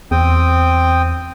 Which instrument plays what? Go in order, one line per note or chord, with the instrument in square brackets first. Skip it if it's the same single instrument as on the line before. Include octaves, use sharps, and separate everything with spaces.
[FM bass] E2 [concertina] C4 G5 D#6